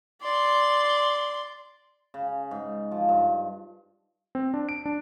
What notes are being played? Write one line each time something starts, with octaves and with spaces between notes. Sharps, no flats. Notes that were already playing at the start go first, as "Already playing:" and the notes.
D5 C6
C#3
G#2
F3
G2
C4
D4
D7
D4